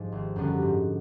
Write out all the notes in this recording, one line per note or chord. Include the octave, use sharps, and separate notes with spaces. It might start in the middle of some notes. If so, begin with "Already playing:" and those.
Already playing: G#2 F3
G#1
F#2 D3 G3 B3
G#2